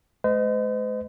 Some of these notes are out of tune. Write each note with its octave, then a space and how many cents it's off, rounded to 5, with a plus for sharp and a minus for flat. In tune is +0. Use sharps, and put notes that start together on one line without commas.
G#3 +45 C5 -45 D#5 +0